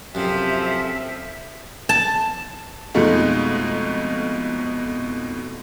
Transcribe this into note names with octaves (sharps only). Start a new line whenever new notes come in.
F#2 C3 F3 C4 A4 E5
A5
F2 B2 G#3 A3 D#4 F4